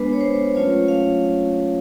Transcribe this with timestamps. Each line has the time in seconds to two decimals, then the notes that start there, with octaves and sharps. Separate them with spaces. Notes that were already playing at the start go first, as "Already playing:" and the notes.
Already playing: G#3 B3 D4 B4
0.13 C#5
0.21 C5
0.55 F#3 A3 C#4 F4 C#5
0.88 F5